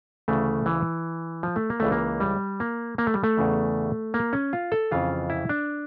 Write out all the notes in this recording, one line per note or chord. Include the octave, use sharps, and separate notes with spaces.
D2 C#3 E3 A3
E3
F3
A3
A#3
C#2 C#3 E3 A3
A#3
G3
A#3
A#3
A3
G3
A3
E2 C#3 E3
A#3
C#4
F4
A4
F2 C#3 E3 F4
E4
D4